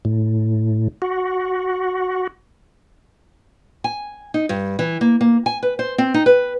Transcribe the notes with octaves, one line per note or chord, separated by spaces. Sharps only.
A2
F#4
G#5
D#4
G2
E3
A#3
A#3
G#5
B4
C5
C4
D#4
B4